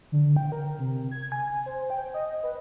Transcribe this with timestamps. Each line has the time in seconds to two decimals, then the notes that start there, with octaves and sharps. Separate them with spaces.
0.12 D3
0.36 G5
0.52 A#4
0.79 C3
1.11 G#6
1.32 G#5
1.66 C5
1.90 G5
2.14 D#5
2.43 B4